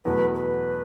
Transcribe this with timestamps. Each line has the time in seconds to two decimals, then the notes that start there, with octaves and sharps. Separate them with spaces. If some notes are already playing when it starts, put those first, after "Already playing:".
0.05 E2 B2 F#3 A3 B4
0.35 B4